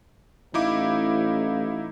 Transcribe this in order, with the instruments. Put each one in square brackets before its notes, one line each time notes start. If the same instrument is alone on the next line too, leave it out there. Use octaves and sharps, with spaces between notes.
[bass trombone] A1 [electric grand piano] D#4 E4 D6 [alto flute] F5